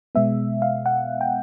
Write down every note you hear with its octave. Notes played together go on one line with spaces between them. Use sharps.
B2 G#3 B3 E5
F5
F#5
G5